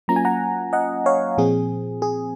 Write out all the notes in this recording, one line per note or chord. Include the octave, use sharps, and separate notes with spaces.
F#3 A#3 C#4 F4 A#5
G#5
F#5 A#5
D#5 F#5
C#5 F5
A#2 F3 C4 G#4
G#4